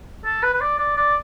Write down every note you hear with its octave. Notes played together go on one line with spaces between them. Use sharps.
A4
B4
B4
D5
D5
D5